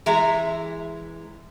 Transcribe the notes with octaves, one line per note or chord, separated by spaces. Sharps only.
E3 G#3 E5 A#5